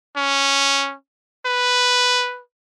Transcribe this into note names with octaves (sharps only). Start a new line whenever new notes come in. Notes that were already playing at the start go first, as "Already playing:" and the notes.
C#4
B4